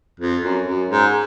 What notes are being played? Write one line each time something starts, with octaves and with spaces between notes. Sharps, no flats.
F2
F#2
F#2
G#2